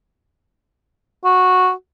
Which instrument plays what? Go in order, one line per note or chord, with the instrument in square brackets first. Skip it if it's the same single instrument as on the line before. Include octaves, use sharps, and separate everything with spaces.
[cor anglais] F#4